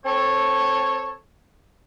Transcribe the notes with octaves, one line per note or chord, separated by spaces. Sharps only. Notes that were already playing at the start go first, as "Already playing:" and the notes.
C4 A4 C#5